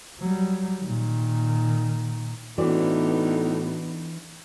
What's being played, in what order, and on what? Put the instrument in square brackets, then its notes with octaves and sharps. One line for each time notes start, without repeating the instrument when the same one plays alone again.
[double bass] F#3 G3
A#2 D#3
[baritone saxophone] A2 [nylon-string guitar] E3 D4 D5 [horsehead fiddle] B3 D#4 [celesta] F#4